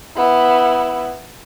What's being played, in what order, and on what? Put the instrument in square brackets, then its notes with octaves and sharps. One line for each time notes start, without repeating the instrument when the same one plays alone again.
[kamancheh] B3 E4